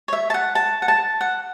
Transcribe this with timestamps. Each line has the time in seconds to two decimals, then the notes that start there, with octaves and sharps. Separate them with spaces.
0.08 C#5
0.13 E5
0.30 A5
0.34 F#5
0.55 A5
0.82 F#5
0.88 A5
1.21 F#5